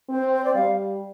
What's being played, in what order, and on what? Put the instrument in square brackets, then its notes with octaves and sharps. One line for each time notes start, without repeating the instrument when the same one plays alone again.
[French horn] C4 [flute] C5
[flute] C5
D5
[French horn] G3 [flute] F5